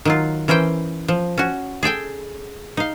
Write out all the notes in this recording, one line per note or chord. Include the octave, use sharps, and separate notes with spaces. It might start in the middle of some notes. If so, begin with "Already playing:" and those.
D#3 F#3 F4
E3 C#4 A#4 C5 G5
F3
C#4 F#4
G#4 A4 G5 G#5
D#4 F5